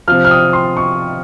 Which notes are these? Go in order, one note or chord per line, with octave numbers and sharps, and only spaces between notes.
C3 F3 F6
F6
D#6
C6
C#6